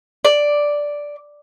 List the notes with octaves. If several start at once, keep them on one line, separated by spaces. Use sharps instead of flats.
D5